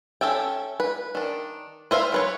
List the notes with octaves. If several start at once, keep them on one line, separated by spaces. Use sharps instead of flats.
C#4 A4 E5 G5
B4
D#3 D4
B4 C5 E5 F5
F#3 B4 C#5